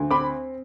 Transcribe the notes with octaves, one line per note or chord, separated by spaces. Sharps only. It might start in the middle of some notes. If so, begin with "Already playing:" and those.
Already playing: D2
C4 B5 D6